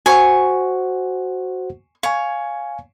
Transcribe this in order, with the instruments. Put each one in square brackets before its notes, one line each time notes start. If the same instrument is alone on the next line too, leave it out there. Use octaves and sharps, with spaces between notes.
[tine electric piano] F#4 C5 F#5 [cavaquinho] G#5 C#6
[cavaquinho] C#5 [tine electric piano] F5 G#5